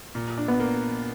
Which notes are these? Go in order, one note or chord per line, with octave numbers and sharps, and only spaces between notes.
A#2
D4
B3
A#3